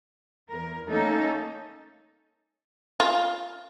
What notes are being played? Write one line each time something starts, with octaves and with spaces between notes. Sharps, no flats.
E2 A#4
A3 A#3 C#4 D#4 A4
F4